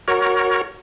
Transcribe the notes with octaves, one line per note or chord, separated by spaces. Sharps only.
F#4 A#4 C#5